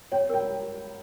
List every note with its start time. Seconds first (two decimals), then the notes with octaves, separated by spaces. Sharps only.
0.12 C#5 G5
0.30 A#4 G5